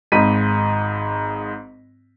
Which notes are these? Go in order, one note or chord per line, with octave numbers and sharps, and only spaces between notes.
G#1 G#2 D#5 B5 B6 D#7